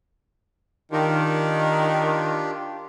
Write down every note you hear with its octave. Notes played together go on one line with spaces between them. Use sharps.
D#3 D4 F4 G4